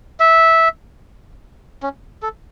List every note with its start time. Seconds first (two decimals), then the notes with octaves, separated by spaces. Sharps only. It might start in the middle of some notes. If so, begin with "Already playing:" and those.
0.20 E5
1.83 C#4
2.23 A4